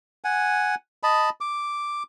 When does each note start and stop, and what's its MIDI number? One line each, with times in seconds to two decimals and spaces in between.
0.24 0.75 78
0.24 0.75 80
1.03 1.30 75
1.03 1.30 81
1.03 1.30 83
1.41 2.03 86